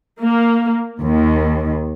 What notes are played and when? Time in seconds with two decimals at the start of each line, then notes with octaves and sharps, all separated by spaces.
0.23 A#3
1.00 D#2